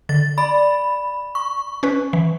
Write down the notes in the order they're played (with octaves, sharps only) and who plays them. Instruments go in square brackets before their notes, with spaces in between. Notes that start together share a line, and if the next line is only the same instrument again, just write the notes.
[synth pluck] D3 [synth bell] A6
[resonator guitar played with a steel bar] D5 [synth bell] B5
[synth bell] C#6
[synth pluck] C#4 B4
E3